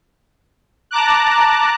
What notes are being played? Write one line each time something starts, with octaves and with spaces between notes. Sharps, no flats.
A5 A#5 D6 F#6